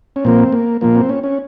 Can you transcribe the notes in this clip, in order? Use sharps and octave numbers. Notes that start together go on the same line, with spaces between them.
C#4
A#2 F3 A#3 C4
A#3
A#2 F3 A#3
C4
C#4
C#4